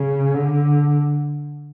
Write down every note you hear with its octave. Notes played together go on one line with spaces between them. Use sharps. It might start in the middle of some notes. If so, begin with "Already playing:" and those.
Already playing: C#3
D3